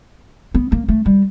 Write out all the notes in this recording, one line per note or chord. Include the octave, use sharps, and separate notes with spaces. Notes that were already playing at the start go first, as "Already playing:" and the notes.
B3
A#3
A3
G3